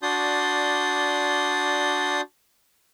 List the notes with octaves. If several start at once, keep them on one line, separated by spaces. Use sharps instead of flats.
D4 F#4 D5 C6 D#6 G6